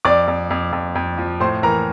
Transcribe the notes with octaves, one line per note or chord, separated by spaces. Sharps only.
F2 D5 D6
F2
F2
F2
F2
F3
A2 C5 C6
E3 A#4 A#5